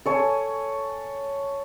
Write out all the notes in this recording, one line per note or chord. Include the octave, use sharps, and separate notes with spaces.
A4 C#5 G#5